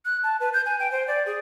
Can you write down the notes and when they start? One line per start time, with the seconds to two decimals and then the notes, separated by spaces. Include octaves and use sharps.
0.05 F#6
0.23 A5
0.40 B4
0.53 G6
0.66 G#5
0.79 G5
0.92 C5
1.07 D5
1.26 G#4